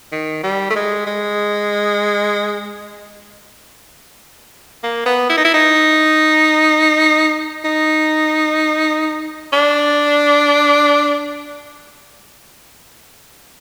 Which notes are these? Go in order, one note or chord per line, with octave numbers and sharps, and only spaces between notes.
D#3
G3
A3
G#3
G#3
A#3
B3
E4
D#4
E4
D#4
D#4
D4